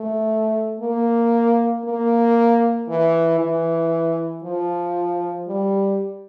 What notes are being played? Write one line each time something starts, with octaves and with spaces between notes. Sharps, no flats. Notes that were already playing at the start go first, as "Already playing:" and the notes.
Already playing: A3
A#3
A#3
E3
E3
F3
G3